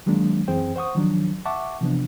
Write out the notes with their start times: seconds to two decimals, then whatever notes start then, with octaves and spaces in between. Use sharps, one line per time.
0.06 D#3 F#3 G#3 A#3 D4
0.48 F#2 E3 C4 G#4 C5 G5
0.76 C5 F#5 C#6 D#6
0.95 D#3 F3 F#3 D4
1.46 E5 F#5 A5 C#6 D6
1.81 C3 E3 F3 B3 D4